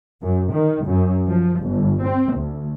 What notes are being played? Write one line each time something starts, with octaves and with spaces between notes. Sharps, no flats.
F#2
D#3
F#2
F3
G1
C4
D2